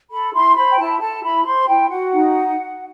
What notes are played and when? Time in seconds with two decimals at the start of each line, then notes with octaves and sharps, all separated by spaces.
0.10 A4 B5
0.33 E4 C6
0.55 C5 B5
0.71 G5
0.78 E4 A5
1.00 A4 A5
1.23 E4 B5
1.45 C5 C6
1.67 E4 G5
1.90 F#4 F#5
2.12 D#4